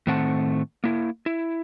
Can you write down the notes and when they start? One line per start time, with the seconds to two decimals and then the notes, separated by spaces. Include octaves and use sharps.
0.07 A2 D#3 A3 C4 F#5 A5
0.84 A#3 E4
1.26 E4